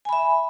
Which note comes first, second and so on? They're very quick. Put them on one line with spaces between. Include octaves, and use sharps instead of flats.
G#5 B5 E5